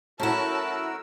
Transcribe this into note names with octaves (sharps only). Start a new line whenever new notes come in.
F#3 A3 C#4 E4 F#4 A#4 A5 E6